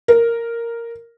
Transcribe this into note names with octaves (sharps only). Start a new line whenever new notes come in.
A#4